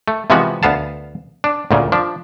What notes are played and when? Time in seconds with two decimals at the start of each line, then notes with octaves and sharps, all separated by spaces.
0.08 A3
0.30 C3 E3 F3 G#3 B3 F#4
0.63 D2 B3 F5 A5
1.44 D4
1.71 D2 A#2 C#3
1.92 F3 D4